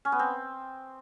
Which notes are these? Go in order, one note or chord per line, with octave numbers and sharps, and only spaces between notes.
C#4
B3
C4